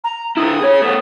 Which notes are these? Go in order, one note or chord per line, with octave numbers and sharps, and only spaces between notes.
A#5
D3 E4 D#6
G#4 C#5
A3 B3